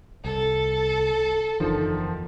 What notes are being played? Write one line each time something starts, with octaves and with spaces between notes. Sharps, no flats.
C2 A4
F#1 E2 D3 D#3 F3